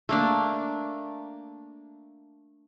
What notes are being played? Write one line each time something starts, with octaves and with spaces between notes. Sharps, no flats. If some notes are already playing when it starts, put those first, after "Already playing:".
A3 A#3 D4